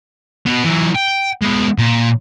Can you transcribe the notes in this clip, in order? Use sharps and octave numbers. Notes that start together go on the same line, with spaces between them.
B2 B3
E3 F#3
G5
G#3 B3
A#2